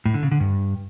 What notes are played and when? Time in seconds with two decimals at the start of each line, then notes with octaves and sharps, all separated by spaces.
0.06 A2
0.14 D3
0.23 C#3
0.32 D3
0.40 G2